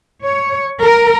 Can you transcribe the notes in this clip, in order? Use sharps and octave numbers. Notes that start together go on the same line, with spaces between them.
C#5
A#4